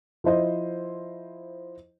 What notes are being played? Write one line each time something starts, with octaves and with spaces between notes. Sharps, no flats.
F3 E4 C5 D#5